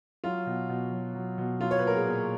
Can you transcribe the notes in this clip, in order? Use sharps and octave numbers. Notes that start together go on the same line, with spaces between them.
F#3 F4
B2
B2
F#3
F#3
B2
F#3 F4
C#5
B4
A#2 A#4
G#4
A#2